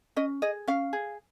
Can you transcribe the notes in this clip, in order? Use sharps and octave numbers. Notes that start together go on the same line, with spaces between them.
C#4 D#5
G#4 D#5
C#4 F5
G#4